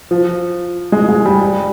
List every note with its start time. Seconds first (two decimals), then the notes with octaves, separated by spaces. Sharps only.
0.11 F3
0.92 G#3
1.09 G#3
1.26 G3
1.41 G3